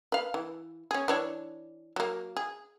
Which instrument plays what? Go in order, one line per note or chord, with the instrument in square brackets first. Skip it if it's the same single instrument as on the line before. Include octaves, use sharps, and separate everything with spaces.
[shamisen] B4 F5
E3
C#4 G#4
E3 D4 C#5
F#3 A#3
G#4